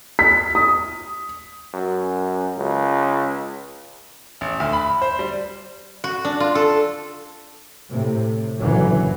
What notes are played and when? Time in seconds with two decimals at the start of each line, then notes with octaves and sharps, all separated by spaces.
0.19 B6
0.55 D#6
1.74 F#2
2.57 C#2
4.41 A1
4.60 D2
4.73 B5
5.02 C5
5.19 G3
6.04 F#4
6.25 D4
6.40 F4
6.55 A4
7.92 A2 C3
8.61 F#1 F#2 A#2 D3 E3 F#3